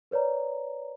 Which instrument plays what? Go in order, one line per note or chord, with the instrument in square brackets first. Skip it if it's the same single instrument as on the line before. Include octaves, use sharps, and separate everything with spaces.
[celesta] A#4 B4 C#5 D5 A#5